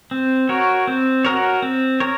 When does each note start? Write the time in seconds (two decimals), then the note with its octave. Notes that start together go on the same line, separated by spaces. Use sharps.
0.11 C4
0.49 F#4 A#4 C#5
0.87 C4
1.25 F#4 A#4 C#5
1.62 C4
2.00 A#4 C#5